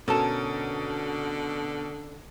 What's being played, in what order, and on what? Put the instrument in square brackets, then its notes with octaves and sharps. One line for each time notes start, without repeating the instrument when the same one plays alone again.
[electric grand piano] B2 [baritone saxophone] D3 [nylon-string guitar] C#4 A#4 [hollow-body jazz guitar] A4 A5